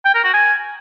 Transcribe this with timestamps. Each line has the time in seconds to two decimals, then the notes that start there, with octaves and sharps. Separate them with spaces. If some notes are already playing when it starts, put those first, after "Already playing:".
0.05 G5
0.15 A#4
0.24 F#4
0.34 G#5